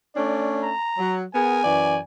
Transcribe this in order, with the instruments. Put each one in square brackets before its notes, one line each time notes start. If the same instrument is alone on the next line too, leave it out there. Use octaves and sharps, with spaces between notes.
[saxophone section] A3 C#4 D4 [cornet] D5
[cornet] A#5
[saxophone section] F#3
[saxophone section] B3 G#4 A#4 [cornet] G#5
[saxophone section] F#2 E3 D5